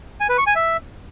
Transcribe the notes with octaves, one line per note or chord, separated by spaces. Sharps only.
G#5
B4
C#6
G#5
E5